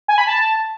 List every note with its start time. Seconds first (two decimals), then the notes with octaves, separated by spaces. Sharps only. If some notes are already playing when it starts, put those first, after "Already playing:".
0.08 G#5
0.18 B5
0.27 A5